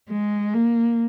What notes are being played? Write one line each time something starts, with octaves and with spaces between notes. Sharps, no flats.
G#3
A#3